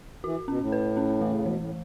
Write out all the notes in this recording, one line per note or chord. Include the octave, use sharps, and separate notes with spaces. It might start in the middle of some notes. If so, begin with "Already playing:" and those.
E3 F#4
B2 C#4
A2
B4
C#4
E3 A3
C#3
B2 E3
A2